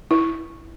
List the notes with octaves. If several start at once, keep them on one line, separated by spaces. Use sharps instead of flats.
E4